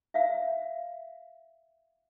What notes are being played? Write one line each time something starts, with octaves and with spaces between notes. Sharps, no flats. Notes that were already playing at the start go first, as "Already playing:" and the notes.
E5 F5